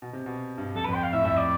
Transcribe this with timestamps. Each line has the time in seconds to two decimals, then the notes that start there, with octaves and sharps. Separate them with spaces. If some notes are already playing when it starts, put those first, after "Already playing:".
0.02 B2
0.13 C3
0.26 B2
0.58 G2
0.75 F2 A4
0.85 B4
0.89 F2
0.94 G5
1.03 F5
1.13 A2 E5
1.25 F2 E5
1.37 D5